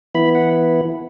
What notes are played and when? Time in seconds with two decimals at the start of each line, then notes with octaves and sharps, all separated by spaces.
0.15 E3 B3 E4 B5
0.35 F#5